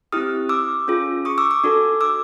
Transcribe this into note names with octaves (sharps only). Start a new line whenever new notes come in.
C4 E4 G4 D#6 F6
D6 E6
C#4 F4 G#4
C#6 D#6
D6 E6
D6 E6
D4 F#4 A4
D6 E6